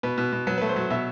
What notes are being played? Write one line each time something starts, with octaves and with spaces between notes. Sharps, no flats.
B2 B4
B2
B2
F#3 B4
B4
A3
C5
F#3
B2 E5